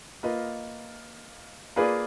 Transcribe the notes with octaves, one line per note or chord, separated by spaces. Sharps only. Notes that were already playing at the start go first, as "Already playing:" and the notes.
A#3 F4 B4 D#5
A#3 F4 G#4 B4 D5